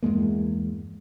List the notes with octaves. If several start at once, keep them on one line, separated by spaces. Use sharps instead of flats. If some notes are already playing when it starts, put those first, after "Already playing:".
E2 G2 G#3 A#3